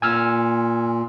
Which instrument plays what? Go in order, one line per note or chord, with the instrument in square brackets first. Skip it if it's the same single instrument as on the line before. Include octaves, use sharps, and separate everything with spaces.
[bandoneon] A#2 [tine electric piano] G#5 E6 F6